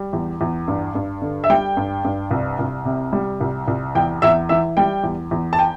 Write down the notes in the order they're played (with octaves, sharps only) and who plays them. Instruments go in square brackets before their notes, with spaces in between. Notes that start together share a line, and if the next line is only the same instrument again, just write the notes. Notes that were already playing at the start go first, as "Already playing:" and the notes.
Already playing: [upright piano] G3
E2
E2
G2
G2
D3
E5
G3 G5
G2
G2
C2
C2
C3
G3
C2
C2
E2 G5
E2 E5
E3 E5
G3 G5
E2
E2
A5
G5